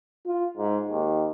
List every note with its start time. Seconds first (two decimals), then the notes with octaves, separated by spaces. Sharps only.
0.26 F4
0.57 G#2
0.89 D#2